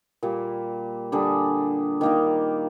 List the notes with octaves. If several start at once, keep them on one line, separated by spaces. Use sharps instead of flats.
A#2 G3 A#3
D3 G3 D4 G#4
D#3 A#3 D#4